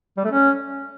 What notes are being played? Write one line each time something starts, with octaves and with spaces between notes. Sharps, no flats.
G3
A3
C#4